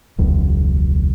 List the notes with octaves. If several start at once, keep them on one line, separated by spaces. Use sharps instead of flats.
E1 C#2 F#2